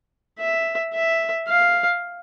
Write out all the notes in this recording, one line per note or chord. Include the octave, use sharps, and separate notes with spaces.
E5
E5
F5